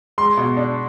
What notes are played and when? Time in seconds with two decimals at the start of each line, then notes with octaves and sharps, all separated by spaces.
0.18 G#3 C6
0.38 B2
0.57 D4